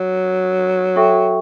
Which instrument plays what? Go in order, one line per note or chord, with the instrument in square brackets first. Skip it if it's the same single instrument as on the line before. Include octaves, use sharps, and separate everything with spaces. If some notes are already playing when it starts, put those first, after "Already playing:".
Already playing: [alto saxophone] F#3
[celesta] F#4 A4 E5 G5 C#6